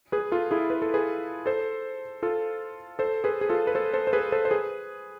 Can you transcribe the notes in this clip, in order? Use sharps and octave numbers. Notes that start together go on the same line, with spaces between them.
G#4 B4
F4 A4
E4 G#4
B4
A4
G#4 B4
A4 C5
F4 A4
A4 C5
G#4 B4
G#4
F4 A4
B4
A4 C5
A4 C5
C5
G#4 B4
A4 C5
C5
G#4 B4